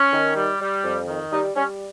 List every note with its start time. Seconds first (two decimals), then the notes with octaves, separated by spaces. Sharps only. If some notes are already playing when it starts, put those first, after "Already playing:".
Already playing: C#4
0.12 D#3
0.36 G3
0.60 G3
0.83 F2
1.07 D#3
1.31 G3 D#4
1.56 G3 C#4